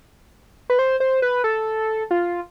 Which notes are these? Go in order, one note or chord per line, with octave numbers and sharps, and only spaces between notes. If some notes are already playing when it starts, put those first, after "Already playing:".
B4
C5
C5
B4
A4
F4